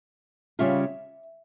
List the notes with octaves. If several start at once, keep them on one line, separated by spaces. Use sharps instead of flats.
C#3 G3 C#4 F4 E5